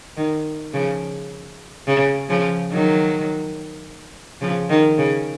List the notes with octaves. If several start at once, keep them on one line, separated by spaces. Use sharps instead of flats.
D#3
C#3 F3
C#3
C#3 F3
D#3 F#3
C#3 F3
D#3
C#3